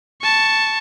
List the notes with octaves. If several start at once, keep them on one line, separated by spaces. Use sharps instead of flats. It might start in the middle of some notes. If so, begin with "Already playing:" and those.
A5 C#6